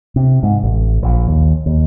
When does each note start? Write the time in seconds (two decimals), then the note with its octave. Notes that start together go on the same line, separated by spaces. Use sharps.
0.16 C3
0.43 G#2
0.63 A1
1.03 A#1
1.27 D#2
1.66 D#2